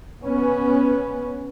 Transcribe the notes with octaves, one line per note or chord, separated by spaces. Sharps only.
B3 C#4